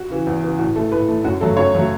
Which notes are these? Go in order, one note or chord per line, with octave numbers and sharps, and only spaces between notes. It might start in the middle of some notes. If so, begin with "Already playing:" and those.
Already playing: F#4
C#3 E3
E2
C#3 E3
A2 F#4
A3 A4
A2 B4
A3
F#2 F#4
C#3 F#3 A3 A4
F#2 C#5
C#3 F#3 A3